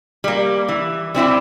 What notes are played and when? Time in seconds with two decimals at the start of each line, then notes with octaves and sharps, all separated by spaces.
0.24 G3 A#3
0.68 E3
1.14 G3 C4 E4 G4